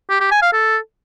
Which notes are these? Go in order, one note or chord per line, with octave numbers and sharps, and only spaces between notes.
G4
G4
G#5
F5
A4